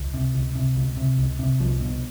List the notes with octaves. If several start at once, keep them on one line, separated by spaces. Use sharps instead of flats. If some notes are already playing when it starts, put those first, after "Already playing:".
Already playing: C#2
C3
C#2
C3
C#2
C3
C#2
C3
C2 F3
B2